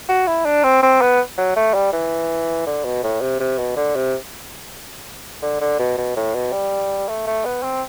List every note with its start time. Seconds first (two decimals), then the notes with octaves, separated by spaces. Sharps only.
0.09 F#4
0.27 E4
0.46 D4
0.63 C4
0.82 C4
1.01 B3
1.38 F#3
1.56 A3
1.74 G3
1.93 E3
2.66 D3
2.84 B2
3.03 A2
3.21 C3
3.40 C3
3.58 B2
3.77 D3
3.96 C3
5.42 D3
5.61 D3
5.79 B2
5.98 B2
6.16 A2
6.34 B2
6.52 G3
7.08 A3
7.27 A3
7.45 B3
7.63 C4